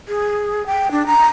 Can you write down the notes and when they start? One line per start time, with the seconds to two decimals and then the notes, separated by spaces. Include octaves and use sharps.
0.08 G#4
0.67 G5
0.91 D4
1.06 A#5